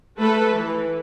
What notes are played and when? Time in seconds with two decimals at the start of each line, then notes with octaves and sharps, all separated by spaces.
0.19 A3 A4 B4
0.56 E3